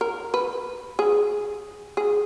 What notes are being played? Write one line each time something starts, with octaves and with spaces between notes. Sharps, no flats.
A#4
B4
G#4
G#4